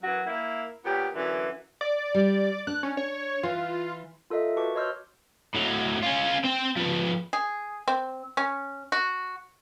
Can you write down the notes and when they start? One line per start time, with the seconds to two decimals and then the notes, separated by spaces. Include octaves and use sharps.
0.03 F#2 E3 F#3 F#4
0.25 A#3 E4
0.85 A#2 B3 C#4 G4
1.15 F#2 D3 E3
1.81 D5
2.14 G3
2.67 D4 F#6
2.83 C#4
2.97 C#5
3.43 E3 F4
4.30 F4 A4 A#4 D#5 E5
4.57 F#4 B4 A5 C#6 D6
4.75 C#5 D#5 C6 E6 F6 G6
5.55 A2 F#3
6.03 C#4 F4
6.44 C4 G5
6.76 F3 B3
7.33 G#4
7.88 C4
8.37 C#4
8.92 F#4